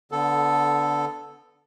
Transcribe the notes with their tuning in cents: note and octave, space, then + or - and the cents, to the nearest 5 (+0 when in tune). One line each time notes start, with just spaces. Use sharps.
D3 -15 B3 +0 A4 +0